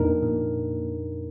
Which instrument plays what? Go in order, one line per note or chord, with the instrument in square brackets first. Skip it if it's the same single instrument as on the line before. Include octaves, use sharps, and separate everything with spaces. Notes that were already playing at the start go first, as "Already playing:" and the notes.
Already playing: [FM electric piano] F2 A#2 [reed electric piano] D4 D#4 A#4
[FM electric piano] A#2